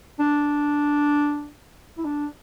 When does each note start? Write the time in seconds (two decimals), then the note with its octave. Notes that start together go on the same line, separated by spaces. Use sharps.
0.19 D4
1.98 E4
2.05 D4